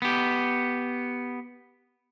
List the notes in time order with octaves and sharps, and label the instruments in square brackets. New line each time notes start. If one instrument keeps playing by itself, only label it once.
[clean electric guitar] B3 G4